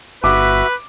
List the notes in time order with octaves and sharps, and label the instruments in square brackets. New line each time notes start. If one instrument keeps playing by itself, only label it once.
[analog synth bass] G1 [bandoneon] F#4 E5 [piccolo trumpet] B4 [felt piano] D6